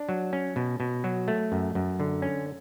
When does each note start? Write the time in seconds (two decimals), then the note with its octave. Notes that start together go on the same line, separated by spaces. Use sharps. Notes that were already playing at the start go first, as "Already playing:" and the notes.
Already playing: D4
0.09 F#3
0.33 C#4
0.56 B2
0.80 B2
1.04 F#3
1.28 A3
1.52 F#2
1.75 F#2
2.00 D3
2.22 C#4